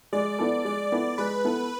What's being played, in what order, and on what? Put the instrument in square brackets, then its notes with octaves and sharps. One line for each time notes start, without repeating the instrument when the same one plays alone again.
[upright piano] G#3 [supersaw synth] D5
[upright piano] B3 E4 A4
[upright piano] G#3 [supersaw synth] D5
[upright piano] B3 E4 A4
[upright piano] G#3 [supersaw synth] B4
[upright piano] B3 E4 A4